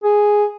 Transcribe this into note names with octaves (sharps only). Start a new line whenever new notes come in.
G#4